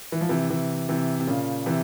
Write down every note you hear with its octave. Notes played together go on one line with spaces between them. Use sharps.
E3
F3
C3 E3
C3 E3
C3 E3
C3
A#2 C#3
C3 E3